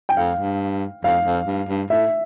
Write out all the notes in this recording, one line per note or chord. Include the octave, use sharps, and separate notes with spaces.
G5
F2 F5
G2
F2 F5
F2
G2
G2
A2 E5